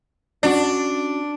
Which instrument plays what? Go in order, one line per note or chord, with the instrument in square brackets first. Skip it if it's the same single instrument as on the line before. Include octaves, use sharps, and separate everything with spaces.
[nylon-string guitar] C#4 F#4 [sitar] D4